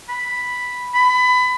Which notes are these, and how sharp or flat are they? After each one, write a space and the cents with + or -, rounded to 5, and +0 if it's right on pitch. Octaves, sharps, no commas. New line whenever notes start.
B5 +0
B5 +25